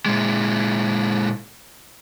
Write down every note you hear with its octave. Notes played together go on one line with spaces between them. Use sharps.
A#2 G#3